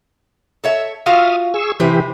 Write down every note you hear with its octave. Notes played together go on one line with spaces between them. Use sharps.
A4 C#5 E5
F4 F#4 E5 F5 D#6 F6
G#4 C#6 E6
C3 E3 G4 B4 C5